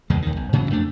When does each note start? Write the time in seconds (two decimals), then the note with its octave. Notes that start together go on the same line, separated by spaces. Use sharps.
0.10 E2 C#3 G#3
0.22 D#2 D#3
0.37 B1
0.53 G#2 C#3 E3 F#3
0.70 F2 A3 D4